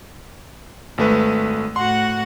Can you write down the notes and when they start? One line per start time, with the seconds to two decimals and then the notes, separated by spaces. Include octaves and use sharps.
0.98 G#1 A3 B4
1.76 A2 F#4 F#5 C6